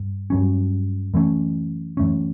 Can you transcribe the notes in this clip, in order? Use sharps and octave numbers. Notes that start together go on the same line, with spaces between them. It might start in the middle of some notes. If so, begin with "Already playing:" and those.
Already playing: G2
G2 F#3 C#4
F#2 E3 A3 C#4
F#2 E3 A3 C#4